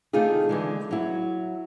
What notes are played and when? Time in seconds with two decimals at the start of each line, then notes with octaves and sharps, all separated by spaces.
0.13 C3 D#3 A3 D#4 F4 G#4
0.49 D3 E3 G#3
0.91 F#3 E4